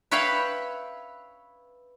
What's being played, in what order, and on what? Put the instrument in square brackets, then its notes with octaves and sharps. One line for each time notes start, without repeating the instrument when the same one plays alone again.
[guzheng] B4 C#5 E5 F5 G5 B5